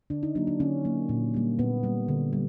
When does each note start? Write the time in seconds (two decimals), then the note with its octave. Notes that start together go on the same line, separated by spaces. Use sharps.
0.10 D3 D4
0.23 D#4
0.35 F#3 A#3 D4
0.47 D4
0.59 D3 C#4
0.85 F#3 A#3
1.09 A#2
1.34 G3 A#3
1.59 A#2 B3
1.83 G3 A#3
2.08 D3
2.33 G3